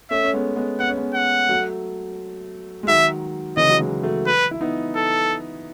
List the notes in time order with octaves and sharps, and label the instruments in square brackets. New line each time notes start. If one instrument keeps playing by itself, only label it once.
[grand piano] A3 C#4 [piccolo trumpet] E5
[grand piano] C#4
G#3 B3
G#3 B3
[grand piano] B3 [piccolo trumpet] F#5
[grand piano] C#4
G#3 B3
[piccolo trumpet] F#5
[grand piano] F#3 A3
G#3
[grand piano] D#3 F#3 [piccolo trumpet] E5
[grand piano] C#3 E3 [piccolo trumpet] D#5
[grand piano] F#3
E3 G#3
F#3 A3
[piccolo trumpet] B4
[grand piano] E4
B3 D#4
[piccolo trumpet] A4